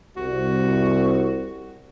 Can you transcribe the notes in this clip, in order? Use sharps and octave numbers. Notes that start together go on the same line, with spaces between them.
C2 F#4